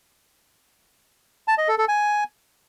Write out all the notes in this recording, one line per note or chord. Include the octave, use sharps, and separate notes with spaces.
A5
D#5
A4
A4
G#5